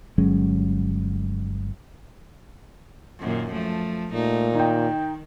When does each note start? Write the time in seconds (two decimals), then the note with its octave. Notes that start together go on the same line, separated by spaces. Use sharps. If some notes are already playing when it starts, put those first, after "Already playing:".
0.18 G1 F#3 G#3 C#4
3.20 F#2 A#2 D#3
3.52 F3 A3
4.13 A#2 A3 D#4
4.55 D#3 D#4 G5